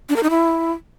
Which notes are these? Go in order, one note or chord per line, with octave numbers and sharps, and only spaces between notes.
D4
A#4
D#4
E4